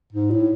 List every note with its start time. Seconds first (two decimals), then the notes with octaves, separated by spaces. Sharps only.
0.12 G#2
0.31 A2